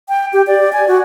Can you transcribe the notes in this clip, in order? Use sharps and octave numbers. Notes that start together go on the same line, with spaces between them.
G5
G4
D5
G#5
F#4